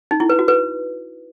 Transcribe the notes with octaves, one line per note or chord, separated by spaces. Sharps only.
D#4
E4
B4
F#4
B4